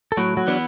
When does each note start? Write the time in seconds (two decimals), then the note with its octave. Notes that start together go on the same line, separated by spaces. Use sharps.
0.12 A4
0.17 A2 F#3 F#4
0.37 F#3 F#4
0.47 E3 B3 D4